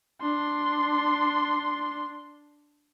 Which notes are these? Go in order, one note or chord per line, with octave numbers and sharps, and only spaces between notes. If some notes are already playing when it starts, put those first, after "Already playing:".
D4 C6